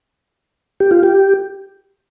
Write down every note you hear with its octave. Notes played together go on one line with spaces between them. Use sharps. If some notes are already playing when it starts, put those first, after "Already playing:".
G4
F4
G4